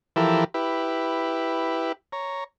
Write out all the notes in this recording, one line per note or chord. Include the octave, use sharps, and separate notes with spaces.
E3 F3 E4 G4 A4 A#4
E4 G4 B4
C#5 A#5